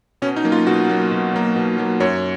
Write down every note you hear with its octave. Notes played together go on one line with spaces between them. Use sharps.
B2 C#4
D#4
F#3 A#3
F4
B2 F#4
F#3 A#3
B2
F#3 A#3
B2
F#3 A#3
F#2 C#5